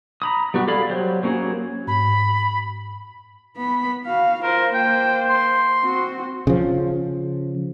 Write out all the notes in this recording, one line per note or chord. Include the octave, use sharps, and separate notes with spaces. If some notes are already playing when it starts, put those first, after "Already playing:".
A#5 B5 D#6
G3 B3 F#4 G4
G#4 A4 D5 F5 B5
F#3 G4 C5
F#3 A#3 C#4 F#4 G#4
G#2 B5
B3 B5
F#4 F5
F4 A#4 C5
A#3 C5 G5
C6
C4 F#4
C#3 F3